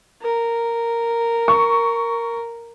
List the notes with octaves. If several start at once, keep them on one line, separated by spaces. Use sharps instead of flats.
A#4
C#6